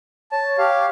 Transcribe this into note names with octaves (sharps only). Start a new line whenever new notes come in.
C#5 A5
G4 F5